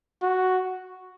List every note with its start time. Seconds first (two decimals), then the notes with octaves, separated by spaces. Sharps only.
0.22 F#4